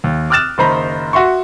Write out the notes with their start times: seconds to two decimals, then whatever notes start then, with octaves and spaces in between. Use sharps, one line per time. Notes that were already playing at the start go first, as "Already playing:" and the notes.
0.04 D#2
0.30 D6 D#6 F6 F#6 A6 E7
0.58 F#1 D#3 C5 A#5 B5
1.13 F#4 E5 C6 C#6